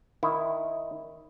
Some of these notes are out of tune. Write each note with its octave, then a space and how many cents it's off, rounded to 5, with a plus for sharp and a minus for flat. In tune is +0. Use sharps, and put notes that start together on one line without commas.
D#3 +0 E4 +0